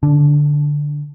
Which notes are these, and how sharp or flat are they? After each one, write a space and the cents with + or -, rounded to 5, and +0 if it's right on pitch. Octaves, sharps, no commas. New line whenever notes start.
D3 +0 D4 -20